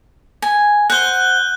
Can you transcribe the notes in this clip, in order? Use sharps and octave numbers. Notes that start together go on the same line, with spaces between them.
G#5
C5 F#5 F#6 G6 G7